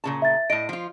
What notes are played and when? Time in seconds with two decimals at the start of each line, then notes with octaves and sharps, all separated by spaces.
0.04 A#2 C#3 A5
0.22 E5 A6
0.50 A2 D#5 D7
0.69 F3 F4